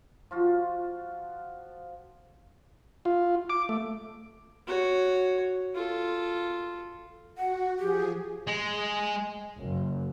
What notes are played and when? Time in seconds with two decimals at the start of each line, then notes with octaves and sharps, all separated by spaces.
0.31 F3 F4 F#4
3.05 F4
3.50 D6
3.69 A3
4.67 F#4 C#5
5.75 F4 A4
7.38 F#4 F#5
7.80 F3 G4 G#4
8.47 G#3
9.61 F#1